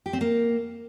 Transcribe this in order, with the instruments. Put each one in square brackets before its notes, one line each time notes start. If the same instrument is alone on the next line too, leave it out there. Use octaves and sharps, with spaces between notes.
[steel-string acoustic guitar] G4
C4
A#3